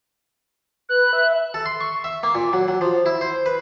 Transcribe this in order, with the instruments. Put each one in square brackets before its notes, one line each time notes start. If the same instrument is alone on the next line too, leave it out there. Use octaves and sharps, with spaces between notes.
[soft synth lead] B4 [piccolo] F#6
[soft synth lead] E5
[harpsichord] A4
C6
C#6
E5
A#3
A#2
F#3
F#3
F3
E4
C5
B4